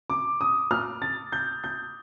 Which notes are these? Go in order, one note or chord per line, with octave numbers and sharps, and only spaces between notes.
D6
D#6
F6
A6
G6
G6